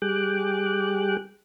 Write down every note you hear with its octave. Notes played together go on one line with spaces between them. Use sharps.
G3 G#4 G5 D6 F#6